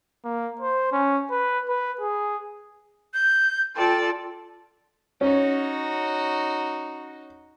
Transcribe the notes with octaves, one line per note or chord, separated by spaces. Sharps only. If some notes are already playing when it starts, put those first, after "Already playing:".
A#3
C5
C#4
B4
B4
G#4
G6
F4 A4 D5 G5
C#4 D#4 F#4